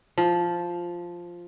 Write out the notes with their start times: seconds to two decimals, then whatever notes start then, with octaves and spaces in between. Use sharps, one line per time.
0.18 F3